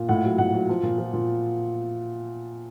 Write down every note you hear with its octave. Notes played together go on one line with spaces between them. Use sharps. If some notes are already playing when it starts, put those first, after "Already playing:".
Already playing: A#2
A2 F#5
F#3
A2 F#5
F#3
F3
A#2
F3
A#2